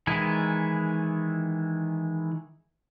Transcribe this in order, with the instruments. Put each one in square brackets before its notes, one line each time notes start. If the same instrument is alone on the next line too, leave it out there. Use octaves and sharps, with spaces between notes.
[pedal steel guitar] D#3 E3 G#3 E4